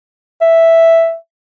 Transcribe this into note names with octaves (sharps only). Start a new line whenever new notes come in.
E5